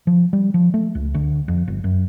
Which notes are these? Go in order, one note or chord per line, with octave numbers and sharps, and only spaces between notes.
F3
G3
F3
A3
C#2
D2
F2
G1
F#2